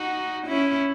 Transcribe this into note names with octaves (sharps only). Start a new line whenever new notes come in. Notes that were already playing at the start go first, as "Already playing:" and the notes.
Already playing: D#4 F#4
C#4 E4